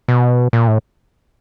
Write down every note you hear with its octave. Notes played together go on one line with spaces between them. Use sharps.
B2
A#2
A2